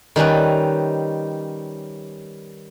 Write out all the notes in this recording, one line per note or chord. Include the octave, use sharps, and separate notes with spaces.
D#3 G3 C#4 B4